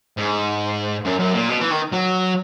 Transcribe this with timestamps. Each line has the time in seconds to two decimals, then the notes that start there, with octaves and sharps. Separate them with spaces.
0.17 G#2
1.05 F#2
1.19 F#2
1.34 A#2
1.49 B2
1.60 E3
1.71 D#3
1.92 F#3